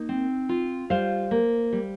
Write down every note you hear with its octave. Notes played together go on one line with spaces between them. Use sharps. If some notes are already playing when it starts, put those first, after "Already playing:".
Already playing: A#3 D#4
C4
F4
G3 C5 F5
A#3
G3